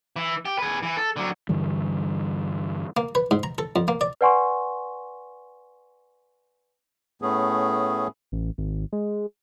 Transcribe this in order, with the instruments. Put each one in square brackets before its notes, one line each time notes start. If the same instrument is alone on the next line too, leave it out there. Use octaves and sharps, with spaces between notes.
[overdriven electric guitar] E3
G4
G#4 B4
E3
A4
D3 F#3
[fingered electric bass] G2 D3 E3 G3
[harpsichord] A#3
B4
G#2
A#5
A4
F2
A#3
D5
[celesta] B4 D5 F#5 G#5 C6 C#6
[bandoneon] A2 A3 B3 C#4 G#4
[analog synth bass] A1
G#1
G#3